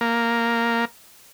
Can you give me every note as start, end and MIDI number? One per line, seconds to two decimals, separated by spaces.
0.01 0.85 58